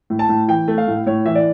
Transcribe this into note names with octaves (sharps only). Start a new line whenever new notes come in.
A2
A5
A2
E3 G5
A3
F5
A2
A2 C#5
E3 E5
D5